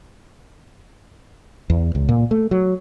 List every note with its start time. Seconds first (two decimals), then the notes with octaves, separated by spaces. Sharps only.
1.70 E2
1.95 C#2
2.09 A#2
2.31 A3
2.51 F#3